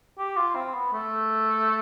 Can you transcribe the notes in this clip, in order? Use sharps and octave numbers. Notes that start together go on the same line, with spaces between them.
G4
F4
C4
B3
A3